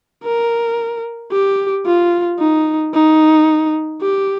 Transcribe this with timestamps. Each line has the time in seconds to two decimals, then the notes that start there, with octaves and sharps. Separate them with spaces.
0.24 A#4
1.32 G4
1.86 F4
2.39 D#4
2.94 D#4
4.02 G4